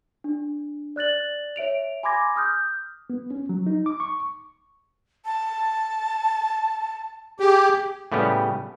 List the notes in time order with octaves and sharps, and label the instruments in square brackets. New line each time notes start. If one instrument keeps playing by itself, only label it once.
[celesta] D4
D5 F#6 A6 F#7
C#5 E5 D7 F7
G#5 B5 C6 D6 G#6 A#6
D#6 F6 G6
[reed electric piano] B3
C#4
F#3
D#4
D6
C#6
[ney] A5
[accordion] G4 [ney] G#4
[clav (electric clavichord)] A2 C#3 G3 B3 G4